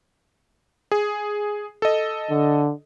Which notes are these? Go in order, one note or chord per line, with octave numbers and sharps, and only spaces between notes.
G#4
A4 D#5
D3